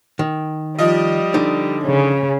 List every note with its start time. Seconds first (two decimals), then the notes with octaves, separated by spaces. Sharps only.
0.19 D#3
0.79 F3 G3 D#5
1.34 D3 D#4
1.84 C#3 C#4